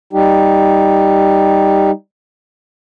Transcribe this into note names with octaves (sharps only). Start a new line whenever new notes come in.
G3 D#4 G4